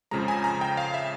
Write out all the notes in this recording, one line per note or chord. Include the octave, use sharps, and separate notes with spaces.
F2 C#3 F3 G#3 A#5
G#5
A#5
G5
F5
E5